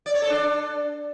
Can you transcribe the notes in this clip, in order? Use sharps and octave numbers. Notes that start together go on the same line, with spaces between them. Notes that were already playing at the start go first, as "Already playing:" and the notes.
D5
C#5
A4
D4